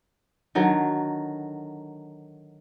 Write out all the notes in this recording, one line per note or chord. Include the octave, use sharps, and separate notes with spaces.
D3 D#3 F#3